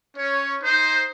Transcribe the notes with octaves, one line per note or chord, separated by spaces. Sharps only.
C#4 C#5
D#4 C5